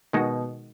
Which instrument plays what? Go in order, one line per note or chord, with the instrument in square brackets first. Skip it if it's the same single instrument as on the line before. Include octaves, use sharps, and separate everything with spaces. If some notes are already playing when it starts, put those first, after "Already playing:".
[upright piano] B2 [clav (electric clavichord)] D#3 G#3 D#4 F#4